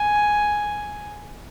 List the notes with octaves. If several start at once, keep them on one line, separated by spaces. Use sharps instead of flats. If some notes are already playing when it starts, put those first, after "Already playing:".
Already playing: G#5